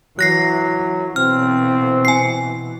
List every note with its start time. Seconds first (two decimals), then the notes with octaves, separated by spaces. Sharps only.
0.19 E3 F#3 F#6 A#6 C7
1.16 B2 E3 C4 F6
2.05 G#5 C7